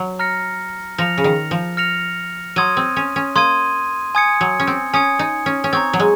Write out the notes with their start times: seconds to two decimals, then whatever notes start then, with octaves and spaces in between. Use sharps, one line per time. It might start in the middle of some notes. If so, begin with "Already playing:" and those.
Already playing: F#3
0.19 A#5 F6 A#6 C#7
0.98 F3 F6 A#6 C#7 F7
1.18 C#3
1.24 D#3
1.51 F3
1.77 F6 A#6 C#7 F7
2.56 F#3 C6 D#6 G#6 D#7
2.77 C4
2.96 C#4
3.16 C#4
3.35 A#3 C6 D#6 G#6 D#7
4.15 G#5 D#6 G#6 C#7
4.41 F#3
4.60 C#4
4.67 C4
4.94 C#4 G#5 D#6 G#6 C#7
5.19 D#4
5.46 C#4
5.64 C#4
5.73 C4 A#5 C#6 G#6
5.93 F#3
5.99 G#3